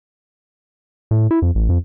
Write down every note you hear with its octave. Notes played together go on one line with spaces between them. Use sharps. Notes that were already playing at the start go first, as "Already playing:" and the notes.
A2
E4
F2
A1
F2